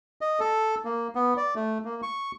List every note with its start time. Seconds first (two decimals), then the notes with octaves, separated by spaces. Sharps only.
0.21 D#5
0.40 A4
0.85 A#3
1.15 B3
1.37 D5
1.55 A3
1.85 A#3
2.02 C#6